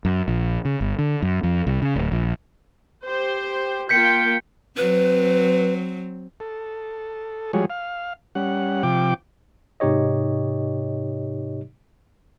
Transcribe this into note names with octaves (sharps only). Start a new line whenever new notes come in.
F#2
A#1
C#3
G1
D3
F#2
F2
C2
C#3
D1
A#1
G4 C5
A#3 F4 G5 G6 B6 C#7
F#3 C4 B4
A4
F3 G3 G#3 F#4 G#4 C#5
F5
G3 C#4 F#5
C3 F3 G5 D6
G#2 C3 D#4 G4 C#5 D#5